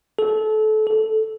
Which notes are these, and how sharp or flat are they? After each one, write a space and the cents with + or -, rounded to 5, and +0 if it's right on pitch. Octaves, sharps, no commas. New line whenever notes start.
A4 -25
A4 -5